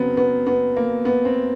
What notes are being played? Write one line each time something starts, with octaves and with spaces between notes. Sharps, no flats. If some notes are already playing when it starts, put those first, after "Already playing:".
Already playing: C#3 F#3 B3 C4
B3
B3
A#3
B3
C4